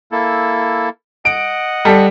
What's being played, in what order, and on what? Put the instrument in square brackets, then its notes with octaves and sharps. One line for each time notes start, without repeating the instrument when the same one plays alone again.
[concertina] A#3 E4 A4
[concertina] D#5 F#5 [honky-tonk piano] D7
[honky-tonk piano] G3 A4